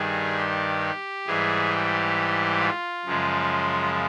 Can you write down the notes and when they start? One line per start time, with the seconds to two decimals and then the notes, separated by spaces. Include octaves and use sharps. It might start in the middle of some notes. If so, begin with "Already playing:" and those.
Already playing: G2 D#3 G3 G#4
0.38 G4
1.27 G#2 E3 G3 G#4
1.72 G4
2.60 F4
3.05 F#2 C#3 F3 G#3